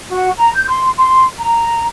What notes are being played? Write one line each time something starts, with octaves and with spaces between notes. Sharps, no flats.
F#4
A#5
G6
C6
C6
A#5